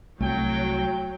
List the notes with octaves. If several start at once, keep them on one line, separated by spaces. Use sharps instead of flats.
C2 F#3 A3 G5